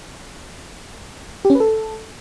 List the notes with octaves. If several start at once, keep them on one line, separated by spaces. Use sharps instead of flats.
G4
C#4
B4
A4